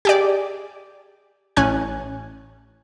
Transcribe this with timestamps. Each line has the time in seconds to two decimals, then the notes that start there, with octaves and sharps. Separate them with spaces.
0.05 G4 G#4 D5
1.57 A1 C#4 G#5 F#6